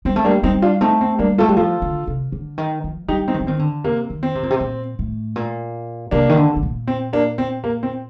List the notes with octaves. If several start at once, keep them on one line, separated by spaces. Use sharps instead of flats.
G3 C4
A3
G3 A#3 D4
G3 C4 D#4
D4 F4
A3 C4 D#4
C4
G3 A#3 D4
A3 F4 A4
G3
F3 F4 A4
D3
C3
D3
D#3
F3
G3 D#4 G4
C4 D#4
D#3
F3
D#3 C4
D3
C3 A#3
D#3
C4
C3
A#2
C3
A#2
A2
A#2
C3 A#3 D4
D#3
D3
C3
A#2
C4
A#3 D4
C4
A#3
C4